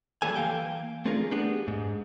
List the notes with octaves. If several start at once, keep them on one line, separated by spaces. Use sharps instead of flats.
E3 F#3 G3 A#3 A4 G#5
E3 A#3 F5 G5
A3 C4 D4 F4 G#4 A#4
A3 B3 D4 G4 G#4
G#2